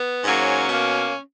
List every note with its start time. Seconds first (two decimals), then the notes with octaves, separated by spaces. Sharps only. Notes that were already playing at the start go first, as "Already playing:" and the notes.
Already playing: B3
0.24 G#2 F#3 A#3 C#4
0.69 B2 A#3